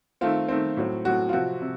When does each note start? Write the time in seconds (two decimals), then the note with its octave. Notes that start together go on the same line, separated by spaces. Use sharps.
0.21 D#3 A3 C4 F4
0.49 D#3 A3 C4
0.77 A2 F#3 C4
1.05 A2 F#3 C4 F#4
1.29 F4
1.33 C3 F3 C4 F#4
1.62 C3